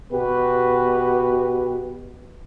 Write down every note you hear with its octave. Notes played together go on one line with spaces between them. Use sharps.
B2 F#4 G4 B4